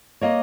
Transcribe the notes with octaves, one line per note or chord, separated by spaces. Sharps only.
A#3 C#5 D#5